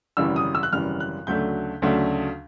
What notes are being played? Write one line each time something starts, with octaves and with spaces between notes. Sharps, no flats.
G#1 F#2 C#3 E3 G3 E6
D#6
E6
F#6
G#1 F#2 C#3 E3 G3 F6
F#6
D2 C#3 F#3 A3 D4 G6
D2 C#3 F#3 A3 D4